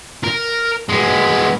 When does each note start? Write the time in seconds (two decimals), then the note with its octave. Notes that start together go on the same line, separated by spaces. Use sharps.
0.24 A#4
0.89 G#3 B3